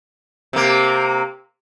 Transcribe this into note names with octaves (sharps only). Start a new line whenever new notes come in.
C3 A#3